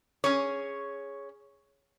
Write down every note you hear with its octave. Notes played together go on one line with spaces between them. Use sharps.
C#4 G#4 C#5